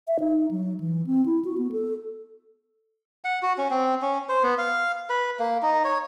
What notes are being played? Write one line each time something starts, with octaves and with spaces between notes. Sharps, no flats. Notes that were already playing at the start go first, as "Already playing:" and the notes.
E5
D#4
F#3
E3
C4
E4
F#4
B3
A4
F#5
F#4
C#4
C4
C#4
C5
B3
F5
B4
A#3
D#4
C#5